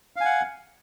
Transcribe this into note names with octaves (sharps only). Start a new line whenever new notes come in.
F5 F#5 G#5